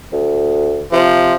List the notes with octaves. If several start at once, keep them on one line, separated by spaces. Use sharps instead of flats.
D2
C3 F3